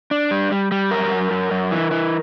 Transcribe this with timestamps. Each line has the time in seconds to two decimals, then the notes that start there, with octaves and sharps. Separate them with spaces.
0.11 D4
0.31 G3
0.51 G3
0.71 G3
0.91 F#2 A#4
1.11 F#2
1.31 F#2
1.51 F#2
1.71 E3
1.91 E3